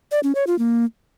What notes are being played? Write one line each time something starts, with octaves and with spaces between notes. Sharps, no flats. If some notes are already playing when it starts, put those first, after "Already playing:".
D5
C#4
C#5
F4
A#3